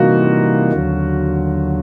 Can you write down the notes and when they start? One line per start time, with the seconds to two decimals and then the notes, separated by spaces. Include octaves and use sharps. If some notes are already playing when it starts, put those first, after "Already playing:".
Already playing: C3 E3 G3 A#3 D#4 F4 F#4
0.72 D#2 D3 F#3